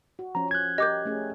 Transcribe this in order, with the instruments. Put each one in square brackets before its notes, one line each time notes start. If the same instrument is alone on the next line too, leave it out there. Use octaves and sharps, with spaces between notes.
[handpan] F#4
[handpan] F3 C#4 [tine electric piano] A#5
[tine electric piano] F#6 G#6
[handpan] G4 A#4 [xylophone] D#5 D6 G6
[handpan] A3 C#4 G#4